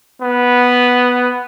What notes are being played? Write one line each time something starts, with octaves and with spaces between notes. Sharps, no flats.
B3